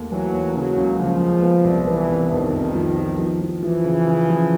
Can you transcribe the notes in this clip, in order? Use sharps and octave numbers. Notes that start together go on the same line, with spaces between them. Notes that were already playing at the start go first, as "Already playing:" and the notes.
Already playing: D#2 A3
E3 F#3
D#2
C#3 F#3
C#2
C#3 F3
G#3
B3
C2
E3 B3
C2
F2 D#3
F2
F3
F3
F3
F3
E3 F3
C#3
C#3
F3